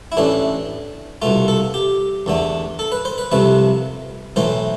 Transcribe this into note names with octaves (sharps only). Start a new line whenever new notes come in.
E4
A1 A2 E3 A3 D4
C2 B2 A3 F4
A4
G4
E2 D3 A3
A4
B4
C5
B4
C2 C3 F3 A3 B4
B1 A2 E3 A3 C5